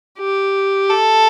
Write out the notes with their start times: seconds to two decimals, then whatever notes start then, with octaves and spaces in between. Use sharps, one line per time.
0.19 G4
0.89 A4